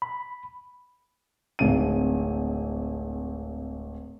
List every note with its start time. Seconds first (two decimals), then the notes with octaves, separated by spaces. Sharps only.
0.02 B5
1.59 D1 G#1 D#7